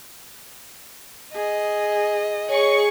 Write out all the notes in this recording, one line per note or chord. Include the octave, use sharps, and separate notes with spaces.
G#4 D#5
G#4 C#5 C#6